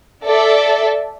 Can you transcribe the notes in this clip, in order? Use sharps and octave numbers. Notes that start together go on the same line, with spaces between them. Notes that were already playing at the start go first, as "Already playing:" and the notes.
A4 D5 E5